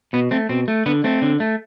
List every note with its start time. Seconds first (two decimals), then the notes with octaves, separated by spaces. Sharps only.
0.13 B2 B3
0.31 A3 C4
0.49 B2 C4
0.68 A3
0.86 D3 B3
1.04 A3 C4
1.22 D3
1.40 A3